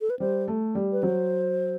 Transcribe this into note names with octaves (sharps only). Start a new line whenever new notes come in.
A4
B4
G3 C5
A3
G3
B4
F#3 C5